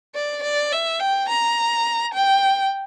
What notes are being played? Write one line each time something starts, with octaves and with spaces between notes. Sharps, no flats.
D5
D5
E5
G5
A#5
G5